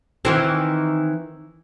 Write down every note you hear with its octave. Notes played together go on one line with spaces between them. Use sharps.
D#3 E3 C4